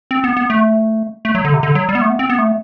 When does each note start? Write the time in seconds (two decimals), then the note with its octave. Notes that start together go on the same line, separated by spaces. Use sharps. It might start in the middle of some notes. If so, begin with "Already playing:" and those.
0.11 C4
0.24 B3
0.37 B3
0.50 A3
1.25 A3
1.35 F#3
1.45 D3
1.54 C3
1.63 D3
1.75 F#3
1.89 G3
1.95 B3
2.01 A3
2.10 B3
2.19 C4
2.30 B3
2.39 A3